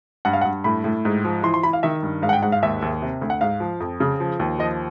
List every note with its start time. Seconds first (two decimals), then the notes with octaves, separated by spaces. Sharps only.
0.25 G2 F#5
0.33 F5
0.41 F#5
0.45 G2
0.64 A2 B5
0.84 A2
1.05 G#2
1.25 F3
1.43 E3 C6
1.54 C6
1.63 E3 B5
1.73 F5
1.83 D#3 E5
2.03 G2
2.22 G#2 F5
2.29 F#5
2.33 G5
2.42 G#2 F#5
2.52 F5
2.63 D#2 E5
2.82 D#2
3.02 C3
3.21 D2
3.30 F#5
3.41 G#2 F5
3.60 F3
3.80 F2
4.00 C#3
4.20 F3
4.40 D#2
4.59 F3 D#5